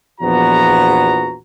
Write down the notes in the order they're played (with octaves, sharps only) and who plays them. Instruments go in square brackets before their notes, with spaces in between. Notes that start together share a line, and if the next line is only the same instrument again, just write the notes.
[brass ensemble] A#1 E2 F3 B3 F#4 A#5